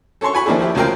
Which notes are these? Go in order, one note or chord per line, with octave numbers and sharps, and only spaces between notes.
A4 C#5 A5 C6 C#6
F#4 G#5 B5 C#6
D#3 F3 A#3 D4 E4 G#4
F3 E4 G4
D2 C#3 F#3 F4 A#4 G5